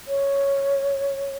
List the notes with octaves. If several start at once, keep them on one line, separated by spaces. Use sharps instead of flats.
C#5